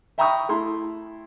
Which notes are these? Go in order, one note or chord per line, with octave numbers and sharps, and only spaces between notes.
E5 G5 A#5 B5 C#6 D#6
A3 E4 C6